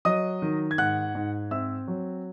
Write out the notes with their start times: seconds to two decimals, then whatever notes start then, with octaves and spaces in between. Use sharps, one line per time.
0.05 F#3 D#5 D#6
0.42 D#3
0.71 G#6
0.78 G#2 F#5 F#6
1.15 G#2
1.51 C4 E5 E6
1.88 F#3